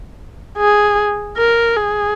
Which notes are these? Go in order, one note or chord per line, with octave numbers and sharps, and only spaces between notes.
G#4
A#4
G#4